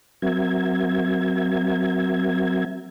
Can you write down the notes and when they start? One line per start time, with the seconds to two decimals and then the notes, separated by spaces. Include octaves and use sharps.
0.22 F#3 C4 F#4 A#4 E5 G#6